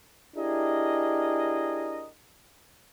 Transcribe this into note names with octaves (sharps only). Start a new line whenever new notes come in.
D4 E4 G4 G#4 A#4 D#5